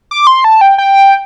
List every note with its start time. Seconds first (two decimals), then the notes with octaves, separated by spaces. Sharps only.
0.11 D6
0.27 C6
0.44 A5
0.61 G5
0.78 G5